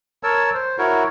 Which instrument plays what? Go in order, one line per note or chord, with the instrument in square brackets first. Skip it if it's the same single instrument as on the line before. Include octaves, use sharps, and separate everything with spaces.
[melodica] A#4 C#5 A5 E6
C5
E4 F#4 A#4 C#5